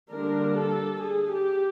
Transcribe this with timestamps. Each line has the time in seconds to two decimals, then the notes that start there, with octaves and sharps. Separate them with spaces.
0.10 D3 G3 A#3 D4 A#4
0.56 A4
1.01 G#4
1.31 G4